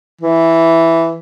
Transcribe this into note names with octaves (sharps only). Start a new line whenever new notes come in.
E3